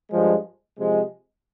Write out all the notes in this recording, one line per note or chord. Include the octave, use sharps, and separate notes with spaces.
G2 F3 G#3
C3 F3 G#3